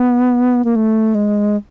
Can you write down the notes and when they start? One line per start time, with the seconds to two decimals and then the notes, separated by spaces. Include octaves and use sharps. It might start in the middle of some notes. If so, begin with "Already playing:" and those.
Already playing: B3
0.65 A#3
0.76 A3
1.15 G#3